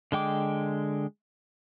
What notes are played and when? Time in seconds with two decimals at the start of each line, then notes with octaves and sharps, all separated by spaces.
0.12 D3 G#3 G5 D6